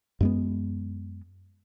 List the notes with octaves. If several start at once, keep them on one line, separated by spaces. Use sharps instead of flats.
F#2 G#3 B3